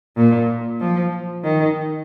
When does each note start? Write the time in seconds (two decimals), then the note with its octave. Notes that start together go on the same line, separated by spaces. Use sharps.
0.17 A#2
0.80 F3
1.44 D#3